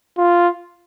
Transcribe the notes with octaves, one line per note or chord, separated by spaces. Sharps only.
F4